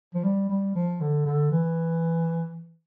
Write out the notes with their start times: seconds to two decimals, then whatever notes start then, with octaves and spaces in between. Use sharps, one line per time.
0.14 F3
0.24 G3
0.49 G3
0.75 F3
1.00 D3
1.26 D3
1.51 E3